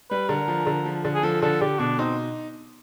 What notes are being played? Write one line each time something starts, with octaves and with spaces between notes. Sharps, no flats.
G3 B4
D3 A#4
F3
D3
F3
D3
G#4
F3 A4
D3 A4
D3 G4
B2 D4
C4 D#4